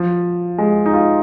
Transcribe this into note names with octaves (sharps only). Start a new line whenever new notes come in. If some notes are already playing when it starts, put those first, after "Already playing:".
Already playing: F3
G#3
D#4
F4